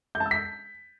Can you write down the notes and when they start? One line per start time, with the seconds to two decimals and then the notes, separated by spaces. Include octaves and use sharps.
0.15 G6
0.20 A5
0.26 E6
0.31 B6